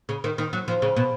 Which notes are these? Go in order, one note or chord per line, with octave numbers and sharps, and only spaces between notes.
C#3
D#3
D#3
F#3
F3
C#3
B2